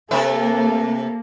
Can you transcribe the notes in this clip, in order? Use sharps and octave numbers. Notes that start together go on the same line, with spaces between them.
C3 A#3 A4 B4 E5